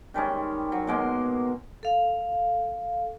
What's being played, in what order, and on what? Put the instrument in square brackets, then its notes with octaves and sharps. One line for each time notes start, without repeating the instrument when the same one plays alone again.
[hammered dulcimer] D#3 G3 G#3 C#4
F#3
B2 G#3 A#3 C6
[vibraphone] A4 F5